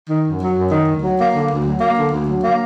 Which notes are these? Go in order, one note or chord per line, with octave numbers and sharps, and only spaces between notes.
D#3
F#2
F#3
F#2
D#3
D2
F#3
A#3
D3
D2
F#3
A#3
D3
D2
F#3
A#3